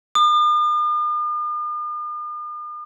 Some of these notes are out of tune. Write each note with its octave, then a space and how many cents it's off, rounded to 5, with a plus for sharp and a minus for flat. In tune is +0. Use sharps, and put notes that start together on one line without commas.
D#6 -45